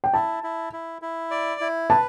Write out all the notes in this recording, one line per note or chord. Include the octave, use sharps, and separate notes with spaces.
G5
E4 A5
E4
E4
E4
D5
E4
B4 A5